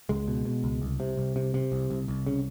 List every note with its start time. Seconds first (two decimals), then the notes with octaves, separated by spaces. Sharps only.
0.09 C#2 G#3
0.28 B2
0.45 B2
0.64 C#2
0.82 C2
1.00 C3
1.17 C2
1.36 C3
1.54 C3
1.72 C2
1.90 C2
2.08 C2
2.26 C#3